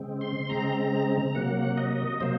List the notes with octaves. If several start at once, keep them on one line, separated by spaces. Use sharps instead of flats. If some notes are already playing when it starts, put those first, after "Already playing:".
Already playing: C#3 G#3 C4
C6
C#3 G#3 C4 A#5
C3 F#3 A#3 F#5
D#5
C3 F#3 A#3 C5